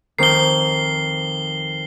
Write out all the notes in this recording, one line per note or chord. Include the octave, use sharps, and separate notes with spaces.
F2 D#3 C7 G7